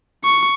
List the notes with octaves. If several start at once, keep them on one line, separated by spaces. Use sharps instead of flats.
C#6